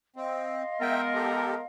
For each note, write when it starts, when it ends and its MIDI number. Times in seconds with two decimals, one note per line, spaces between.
0.16 0.63 60
0.16 1.65 75
0.16 1.65 77
0.16 1.65 84
0.81 1.62 56
0.81 1.62 59
0.81 1.62 70
0.81 1.01 76
0.81 1.01 79
1.14 1.55 67
1.14 1.55 69